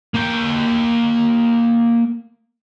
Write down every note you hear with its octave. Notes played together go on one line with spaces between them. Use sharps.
A#3 G5